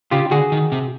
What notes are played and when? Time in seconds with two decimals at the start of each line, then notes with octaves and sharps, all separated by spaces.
0.11 C#3 F4 G4
0.31 D3 F#4 G#4
0.52 D#3
0.72 C3